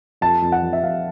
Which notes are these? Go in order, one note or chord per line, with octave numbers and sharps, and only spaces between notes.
F2 A5
F2
F#5
F3
E5
F2 F5